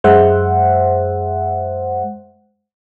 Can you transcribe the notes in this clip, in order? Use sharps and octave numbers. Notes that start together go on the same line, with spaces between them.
F#2 G#3 C5 E5 F#5